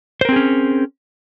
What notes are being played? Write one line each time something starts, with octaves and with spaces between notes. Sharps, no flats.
C4 C#4 G#4 A#4 C5